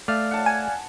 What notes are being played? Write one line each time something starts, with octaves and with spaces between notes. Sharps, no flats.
A3 D5 F5 F6
F#5 A5
G#5